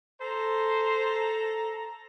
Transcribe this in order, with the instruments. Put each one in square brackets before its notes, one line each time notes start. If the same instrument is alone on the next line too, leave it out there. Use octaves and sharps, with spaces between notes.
[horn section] A4 A#5 [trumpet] C5